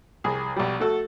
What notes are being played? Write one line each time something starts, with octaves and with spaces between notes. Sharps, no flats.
C2 G#4
B1 G3
A3 F#4 A4